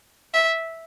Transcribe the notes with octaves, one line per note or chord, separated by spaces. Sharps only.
E5